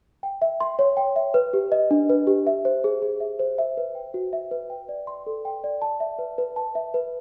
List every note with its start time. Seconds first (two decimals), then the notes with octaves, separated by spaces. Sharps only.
0.23 G5
0.42 E5
0.60 C6
0.79 C#5
0.97 G5
1.16 E5
1.34 B4
1.53 G4
1.72 D#5
1.91 D4
2.10 B4
2.27 G4
2.47 E5
2.65 C5
2.84 G#4
3.02 G#4
3.20 E5
3.39 C5
3.58 E5
3.77 B4
3.95 G5
4.14 F#4
4.33 E5
4.51 B4
4.70 G5
4.89 D5
5.07 C6
5.26 A4
5.45 G5
5.64 D5
5.82 A5
6.00 E5
6.19 B4
6.38 B4
6.56 A5
6.75 E5
6.94 B4